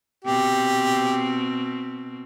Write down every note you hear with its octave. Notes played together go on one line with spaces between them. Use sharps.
B2 C4 G4